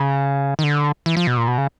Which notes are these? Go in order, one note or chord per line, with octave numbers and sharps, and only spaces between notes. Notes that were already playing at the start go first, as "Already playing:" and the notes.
Already playing: C#3
D#3
D3
E3
F3
B2
A#2
B2
C#3